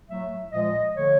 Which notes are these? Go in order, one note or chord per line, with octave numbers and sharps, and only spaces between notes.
A2 F#3 A3 E5
A#2 F3 G#3 D#5
D3 F3 A3 C#5